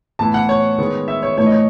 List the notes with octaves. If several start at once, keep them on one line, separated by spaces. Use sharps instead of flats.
A2 E3 B3 A5
F#5
C#5
D#3 G#3 B3
E5
C#5
A2 E3 A3 C#5
D#5
C#5